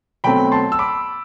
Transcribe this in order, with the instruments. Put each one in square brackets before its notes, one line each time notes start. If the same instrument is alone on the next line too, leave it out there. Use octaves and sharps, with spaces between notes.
[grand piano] B2 F#3 A3 C4 G5 B5
A5 C6
E6
B5 D6